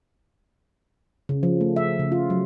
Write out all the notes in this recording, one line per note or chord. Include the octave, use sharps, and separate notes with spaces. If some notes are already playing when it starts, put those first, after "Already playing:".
C#3
F3
A3
E5
C#3
F4
F#3